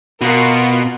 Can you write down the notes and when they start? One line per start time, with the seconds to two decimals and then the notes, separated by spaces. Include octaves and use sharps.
0.22 B2 F4 F#4 A#4